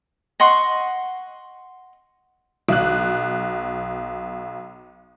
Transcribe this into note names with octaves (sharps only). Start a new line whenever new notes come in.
D#5 F#5 C6 C#6
B1 F#6